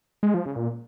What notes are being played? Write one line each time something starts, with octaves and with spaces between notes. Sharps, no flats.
G#3
F3
C#3
A#2